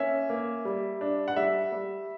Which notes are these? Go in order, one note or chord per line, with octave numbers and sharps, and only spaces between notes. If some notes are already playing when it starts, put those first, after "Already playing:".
Already playing: A#3 C#4 E5
A#3
G3
D4
F#5
G3 E5
G3